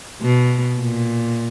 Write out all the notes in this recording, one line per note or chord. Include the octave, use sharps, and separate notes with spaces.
B2
A#2